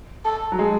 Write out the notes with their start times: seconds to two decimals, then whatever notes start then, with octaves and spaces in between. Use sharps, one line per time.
0.25 A4
0.52 F#3
0.59 G#3